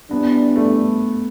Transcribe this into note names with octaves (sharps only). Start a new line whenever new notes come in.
E3 G3 B3 D4
A3